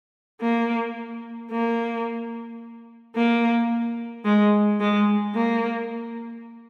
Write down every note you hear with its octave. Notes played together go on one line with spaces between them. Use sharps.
A#3
A#3
A#3
G#3
G#3
A#3